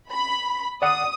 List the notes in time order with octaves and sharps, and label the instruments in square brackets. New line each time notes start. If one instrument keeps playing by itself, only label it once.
[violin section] B5
[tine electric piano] D5 F#5 [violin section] D#6